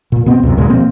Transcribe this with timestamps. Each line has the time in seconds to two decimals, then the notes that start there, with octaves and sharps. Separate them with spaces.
0.12 A#2
0.26 B2 B3 C4
0.43 C#2 F#2 C3
0.57 D2 A#2 C#3 G#3
0.70 B2 F3 A#3 C4